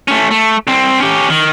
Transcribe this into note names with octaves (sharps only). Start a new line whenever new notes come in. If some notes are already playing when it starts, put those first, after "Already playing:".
A3 C#4
A3
C2 C4
C#4 G4
D#3